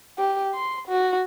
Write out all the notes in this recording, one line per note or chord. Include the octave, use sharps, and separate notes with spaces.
G4
C6
F#4